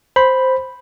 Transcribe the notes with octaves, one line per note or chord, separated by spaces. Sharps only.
C5 B5